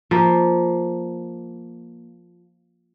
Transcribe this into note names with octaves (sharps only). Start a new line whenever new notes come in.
F3 A#3